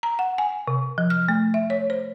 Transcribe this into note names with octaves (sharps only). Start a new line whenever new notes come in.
A#5
F#5
G#5
C3
F3
F6
A3
E5
C#5
C5